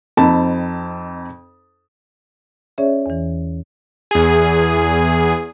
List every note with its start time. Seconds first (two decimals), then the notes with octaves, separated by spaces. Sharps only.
0.17 F2 C4 D#4 A5 B5
2.78 C#4 G#4 C#5 D5 E5
3.06 E2 E3
4.11 E2 G#4